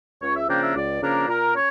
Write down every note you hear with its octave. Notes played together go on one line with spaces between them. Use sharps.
C#2 C#5
E5
C#3 F3 A#3 D4 G5
E5
C#2 D5
C#3 F3 A#3 D4 A#4
A#2 A#4
C#4 C#5